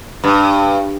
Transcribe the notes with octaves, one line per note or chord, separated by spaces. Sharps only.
G2